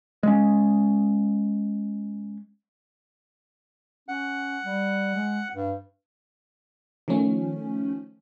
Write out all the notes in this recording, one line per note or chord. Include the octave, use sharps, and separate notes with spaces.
G#3 C#4
C#4 F#5
G3
G#3
G2
D#3 F3 A3 C#4